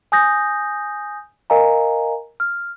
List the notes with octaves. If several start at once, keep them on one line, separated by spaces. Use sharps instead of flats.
G#5 D#6 G6 A#6
A#4 D#5 F5 G#5 A#5
F6